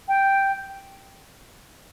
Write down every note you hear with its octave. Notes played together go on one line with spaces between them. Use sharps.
G5